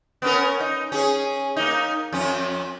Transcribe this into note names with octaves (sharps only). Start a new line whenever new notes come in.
B3 C#4 A#4
D#4
C#4 G#4
A#3 D#4
F2 C#4